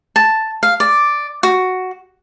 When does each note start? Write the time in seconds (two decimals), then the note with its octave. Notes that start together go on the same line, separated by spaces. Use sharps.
0.16 A5
0.63 F5
0.80 D5
1.43 F#4